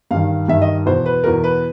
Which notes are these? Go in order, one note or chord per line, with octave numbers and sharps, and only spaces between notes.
G2 D#3 F5
G2 D#3 E5
D#5
E2 B2 C5
B4
E2 B2 A#4
B4